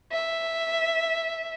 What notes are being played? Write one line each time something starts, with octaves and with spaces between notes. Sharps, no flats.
E5